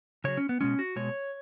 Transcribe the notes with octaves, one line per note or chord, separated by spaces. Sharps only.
C#3 F#3 C#5
C#4
B3
B2 G#3 C#4
F#4
B2 G#3 C#5